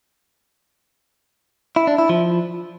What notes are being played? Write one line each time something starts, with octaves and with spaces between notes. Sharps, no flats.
E4
D4
E4
F3